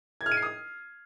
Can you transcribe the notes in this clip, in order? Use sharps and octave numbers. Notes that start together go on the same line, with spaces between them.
G#6
F6
D#7
C7
D#6